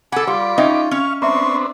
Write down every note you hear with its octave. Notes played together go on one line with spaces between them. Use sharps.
A4 F#5 G#5 B5 D6
G3 F4 G4
C#4 D#4 D#5 E5 G5
C#4 F5 C#6
B3 C4 D4 E5 A#5 C6 C#6